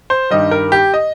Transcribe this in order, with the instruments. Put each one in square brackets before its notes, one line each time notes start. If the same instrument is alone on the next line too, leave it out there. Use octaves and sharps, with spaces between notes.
[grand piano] C5
G2 D#3 G3 D#5
A#4
G4
D#5